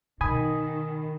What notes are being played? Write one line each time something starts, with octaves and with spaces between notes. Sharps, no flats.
B2 D#3 G#5 B5 D#6